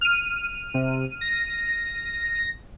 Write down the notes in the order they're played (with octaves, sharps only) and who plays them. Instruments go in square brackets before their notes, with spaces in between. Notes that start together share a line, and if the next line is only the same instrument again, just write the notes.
[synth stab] F6 D#7
[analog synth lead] C3
A#6